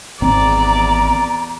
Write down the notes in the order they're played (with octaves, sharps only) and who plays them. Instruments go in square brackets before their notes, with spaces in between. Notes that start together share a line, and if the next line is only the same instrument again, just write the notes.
[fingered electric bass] G#1 G#2 C4 [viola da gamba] E2 D5 [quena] A#5